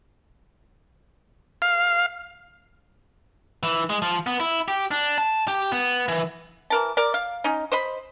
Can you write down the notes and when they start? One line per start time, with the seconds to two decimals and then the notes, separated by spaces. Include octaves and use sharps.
1.62 F5
3.63 E3
3.90 G#3
4.02 F3
4.27 B3
4.40 E4
4.68 G4
4.91 D4
5.18 A5
5.48 G4
5.72 B3
6.08 E3
6.70 E3 A#4 A5
6.97 A#4 D5
7.14 F5
7.44 C#4 D#4
7.72 C5 D#5 B5